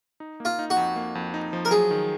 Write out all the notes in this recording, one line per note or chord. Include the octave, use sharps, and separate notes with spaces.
D#4
A#3
F4
D#4
F#4
F2
A#3
F2
D#4
F3
A#4
F#3 G#4
D#3